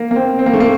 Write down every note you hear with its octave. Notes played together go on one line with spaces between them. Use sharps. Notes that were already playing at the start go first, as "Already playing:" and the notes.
Already playing: A#3
A#3
C4
C4
A#3
A3
A#3